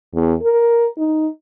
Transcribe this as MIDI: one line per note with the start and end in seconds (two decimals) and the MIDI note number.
0.14 0.34 40
0.43 0.88 70
0.97 1.27 63